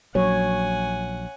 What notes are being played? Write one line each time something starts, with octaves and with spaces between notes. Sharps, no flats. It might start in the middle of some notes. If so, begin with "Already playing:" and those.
A#1 F#3 C#5 F#5 G#5